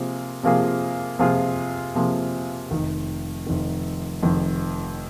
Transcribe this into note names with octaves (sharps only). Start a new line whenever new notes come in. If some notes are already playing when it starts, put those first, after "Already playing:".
Already playing: C3 F3 A#3 F4 G#4
C3 F3 A#3 F4 G#4
C3 F3 A#3 F4 G#4
C3 F3 A#3 F4 G#4
F1 F2 D#3
F1 F2 D#3
F1 F2 D#3